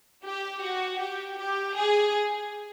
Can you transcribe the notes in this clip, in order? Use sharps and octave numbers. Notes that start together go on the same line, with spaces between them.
G4
F#4
G4
G4
G#4